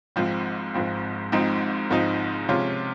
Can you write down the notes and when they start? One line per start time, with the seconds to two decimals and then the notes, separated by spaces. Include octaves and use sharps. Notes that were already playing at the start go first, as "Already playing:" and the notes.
0.16 G#1 G#2 F3 C4
0.74 G#1 G#2 F3 C4
1.32 G#1 G#2 F3 C4 D#4
1.90 G#1 G#2 F3 C4 D#4
2.49 C3 F3 G#3 C#4 F4